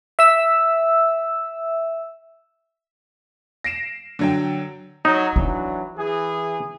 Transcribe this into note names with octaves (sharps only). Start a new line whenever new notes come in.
E5 E6
A#6 C7 D7 E7
D3 F#3 G5
F#3 D#4
E3 F#3 D4 E4
E3 G#4